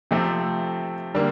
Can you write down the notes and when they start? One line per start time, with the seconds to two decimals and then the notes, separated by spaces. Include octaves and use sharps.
0.11 C3 F3 A3 C4
1.14 D3 G3 A#3